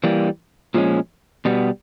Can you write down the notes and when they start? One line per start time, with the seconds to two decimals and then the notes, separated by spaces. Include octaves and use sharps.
0.04 E3 G3 A#3
0.74 A#2 F3 G#3 C#4
1.45 B2 G3 B3